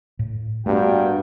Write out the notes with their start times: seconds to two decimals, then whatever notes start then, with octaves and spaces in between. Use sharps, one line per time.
0.19 A2
0.66 G2 A3 B3 F#4 A#4 G5